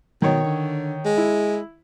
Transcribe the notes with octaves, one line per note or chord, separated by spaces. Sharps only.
B2 D#3 C#5
D3
G#3
E4